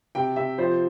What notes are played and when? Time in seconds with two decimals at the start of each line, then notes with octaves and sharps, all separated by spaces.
0.15 C3 G5
0.36 C3 E5
0.58 F3 C5